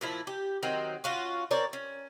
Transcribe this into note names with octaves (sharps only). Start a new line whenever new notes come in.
A#2 F3 E4
G4
D#3 F#3 C4
C#4 F4 F#4
C4 A#4 C#5 D5
C#4